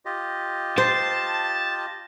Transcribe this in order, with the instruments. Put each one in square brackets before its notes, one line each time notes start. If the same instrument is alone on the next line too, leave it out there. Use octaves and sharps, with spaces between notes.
[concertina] F4 G4 D#5
[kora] C5 [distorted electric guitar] A5